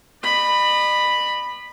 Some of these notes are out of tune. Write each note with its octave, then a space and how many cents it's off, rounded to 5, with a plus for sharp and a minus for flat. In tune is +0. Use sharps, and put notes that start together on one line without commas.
D#5 -45 B5 +0